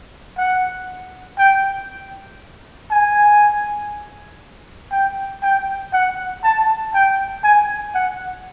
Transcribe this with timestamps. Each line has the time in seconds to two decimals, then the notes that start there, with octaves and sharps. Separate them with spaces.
0.38 F#5
1.39 G5
2.91 G#5
4.92 G5
5.43 G5
5.93 F#5
6.44 A5
6.94 G5
7.44 G#5
7.94 F#5